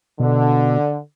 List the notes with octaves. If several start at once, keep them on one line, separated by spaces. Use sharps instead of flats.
B2 D3